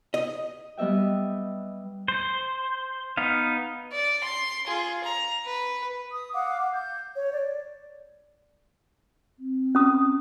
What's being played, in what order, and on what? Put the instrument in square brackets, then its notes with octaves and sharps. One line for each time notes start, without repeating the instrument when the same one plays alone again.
[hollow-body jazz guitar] D#5
[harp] G3 B3 D#5 E5 G5
[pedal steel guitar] C5
B3 D#4 F5
[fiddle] D5
C6
F4 G#4
A#5
B4
[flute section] D#6
F5 F#5 D6
G6
C#5
D5
[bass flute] C4
[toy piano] C#4 D#6